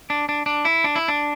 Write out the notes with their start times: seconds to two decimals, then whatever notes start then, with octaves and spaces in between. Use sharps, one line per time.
0.10 D4
0.29 D4
0.46 D4
0.65 E4
0.84 D4
0.96 E4
1.08 D4